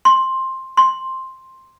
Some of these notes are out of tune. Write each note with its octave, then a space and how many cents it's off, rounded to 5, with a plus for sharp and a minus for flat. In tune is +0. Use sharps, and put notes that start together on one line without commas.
C6 +10
C6 +5